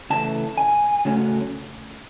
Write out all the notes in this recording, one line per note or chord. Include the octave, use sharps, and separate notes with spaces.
C#3 E3 A3 A5
G#5
C#3 F#3 A3 C#4